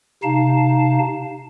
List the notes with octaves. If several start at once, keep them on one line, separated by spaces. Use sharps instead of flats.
C3 D#4 F5 A5